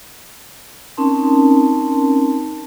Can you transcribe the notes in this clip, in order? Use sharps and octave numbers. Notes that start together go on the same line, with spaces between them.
C4 C#4 D#4 A#4 A5 C6